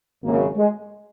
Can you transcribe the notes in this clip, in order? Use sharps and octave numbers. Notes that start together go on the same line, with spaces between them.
G#1 F#2 C#3 A#3
G#3